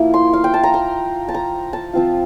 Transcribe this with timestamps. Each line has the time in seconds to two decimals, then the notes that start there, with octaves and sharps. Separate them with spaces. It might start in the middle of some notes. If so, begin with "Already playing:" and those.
Already playing: F3 A#3 E4
0.14 C6
0.33 F5
0.44 G5
0.54 A5
0.63 A#5
0.74 C6
1.28 A5
1.34 A#5
1.73 A5
1.93 F3 C4 F4